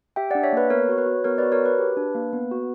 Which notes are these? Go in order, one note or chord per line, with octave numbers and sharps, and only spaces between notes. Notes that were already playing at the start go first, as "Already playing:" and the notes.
G4 E5 G5
D4 D5 F#5
C#5 E5
A#3 B4
B3 A#4 C#5
F#4 C#5
B4
F#4
B3 A#4 C#5
F#4 B4 D5
A#4 C#5
F#4
B4
G4
D4
A#3
B3
F#4